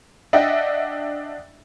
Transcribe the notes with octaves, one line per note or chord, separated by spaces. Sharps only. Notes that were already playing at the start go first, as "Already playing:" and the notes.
D4 D#5 E5 F#5 G5